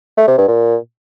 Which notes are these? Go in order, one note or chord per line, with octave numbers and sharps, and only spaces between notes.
A3
C3
G2
A#2